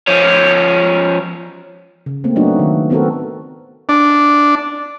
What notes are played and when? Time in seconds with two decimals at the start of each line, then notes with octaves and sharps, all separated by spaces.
0.07 F3 C#4
2.06 C#3
2.24 A3 A#3 C4
2.36 F#3 A3 B3 D4 D#4 F#4
2.59 D#3
2.90 A3 B3 C4 F#4 A4 A#4
3.89 D4